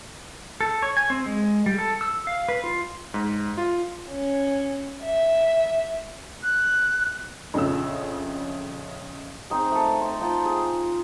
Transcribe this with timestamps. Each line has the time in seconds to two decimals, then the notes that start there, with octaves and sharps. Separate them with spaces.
0.61 A4
0.83 C#5
0.97 G#5
1.10 C4
1.26 G#3
1.66 G3
1.78 A4
2.01 E6
2.27 F5
2.49 B4
2.64 F4
3.14 G#2
3.58 F4
4.09 C#4
5.02 E5
6.43 F#6
7.54 A#1 F2 C#3 F4 E6
9.50 C4 D#4 G#4 G5
9.71 A3 A4
10.01 C5 D#5
10.21 D#4 F4 C5 G5
10.45 G#4